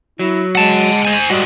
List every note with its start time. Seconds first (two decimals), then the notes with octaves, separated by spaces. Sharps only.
0.19 F#3 E4
0.55 G#3 F#5 A5
1.05 C5 G#5
1.30 A2 G3 G#3 F#4